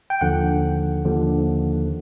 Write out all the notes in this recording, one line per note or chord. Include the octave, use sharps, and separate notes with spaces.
G5
D#2 D3 F3 F#5
D#2 D3 F3